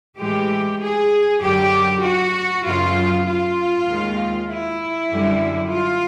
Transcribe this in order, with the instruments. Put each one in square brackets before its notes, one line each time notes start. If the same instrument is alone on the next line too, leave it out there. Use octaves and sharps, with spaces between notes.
[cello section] A2 E3 G#3 G4
G#4
F#2 D3 F#3 G4
F#4
F#2 C#3 F#3 F4
F4
D#2 D#3 G#3
E4
F#2 D3 G3
F4